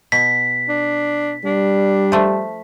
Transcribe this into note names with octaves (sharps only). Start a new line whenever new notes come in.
B2 B6
D4
G3 D4
F3 A3